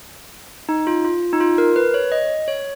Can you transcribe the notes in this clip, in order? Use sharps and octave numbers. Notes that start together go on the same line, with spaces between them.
D#4
F4
F4
D#4
F4
A#4
B4
C#5
D#5
C#5